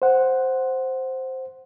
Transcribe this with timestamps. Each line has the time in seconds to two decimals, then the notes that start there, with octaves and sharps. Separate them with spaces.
0.02 C5 F#5